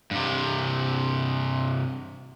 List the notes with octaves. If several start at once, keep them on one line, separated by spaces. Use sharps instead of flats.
G2 C3